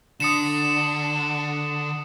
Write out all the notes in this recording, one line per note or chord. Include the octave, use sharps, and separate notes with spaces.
D3 D#6 C#7 E7